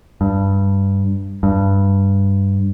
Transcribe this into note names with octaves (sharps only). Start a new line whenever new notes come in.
G2
G2